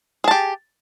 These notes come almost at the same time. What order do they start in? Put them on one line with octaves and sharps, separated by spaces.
G#4 A5 G4